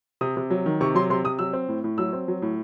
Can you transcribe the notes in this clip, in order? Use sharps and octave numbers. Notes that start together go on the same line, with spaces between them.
C3 D#6
C3
F#3
D#3
C3 C#6
F#3 C6
C3 C6
C3 D#6
F#3 E6
C4
A2
A2
F#3 E6
C4
F#3
A2